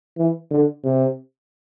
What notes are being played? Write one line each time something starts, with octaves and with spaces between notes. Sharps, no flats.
E3
D3
C3